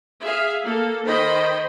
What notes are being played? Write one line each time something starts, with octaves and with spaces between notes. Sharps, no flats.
G#4 E5 F5
A#3 A4
D#3 C5 D#5 G5 B5